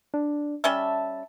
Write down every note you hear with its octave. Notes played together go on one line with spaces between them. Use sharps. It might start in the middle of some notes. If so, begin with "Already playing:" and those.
D4
G3 C#4 E5 A5